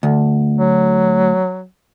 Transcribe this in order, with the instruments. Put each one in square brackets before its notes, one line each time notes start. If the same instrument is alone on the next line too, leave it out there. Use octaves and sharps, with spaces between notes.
[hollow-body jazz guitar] D2
[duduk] F#3